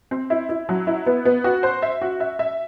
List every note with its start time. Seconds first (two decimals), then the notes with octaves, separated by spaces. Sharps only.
0.11 C4
0.30 E4
0.49 E4
0.69 F#3
0.87 E4
1.06 B3
1.25 B3
1.44 F#4
1.63 C5
1.82 E5
2.02 F#4
2.20 E5
2.39 E5